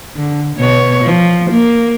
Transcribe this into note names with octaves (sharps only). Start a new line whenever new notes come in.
D3
B2 C#5
F3
A#3